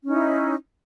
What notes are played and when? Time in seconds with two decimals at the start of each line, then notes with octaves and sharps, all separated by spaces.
0.04 C#4
0.07 D#4
0.11 E4